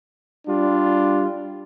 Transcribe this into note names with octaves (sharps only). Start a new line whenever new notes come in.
G3 D4 F4